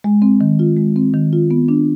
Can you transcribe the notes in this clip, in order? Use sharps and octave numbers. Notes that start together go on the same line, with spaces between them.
G#3
C4
D#3
F4
G#3
C4
D#3
F4
B3
D4